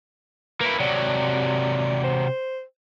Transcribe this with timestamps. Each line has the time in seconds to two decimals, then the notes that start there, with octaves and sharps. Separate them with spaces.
0.61 A#3 E4 B4
0.80 C3 F#3 D5
2.04 C5